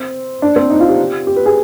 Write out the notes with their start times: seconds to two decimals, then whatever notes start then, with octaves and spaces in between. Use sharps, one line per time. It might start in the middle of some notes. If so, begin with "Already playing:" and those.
Already playing: C4
0.42 D4
0.56 C4
0.70 D#4
0.80 F4
0.89 G4
1.27 G4
1.36 B4
1.46 G#4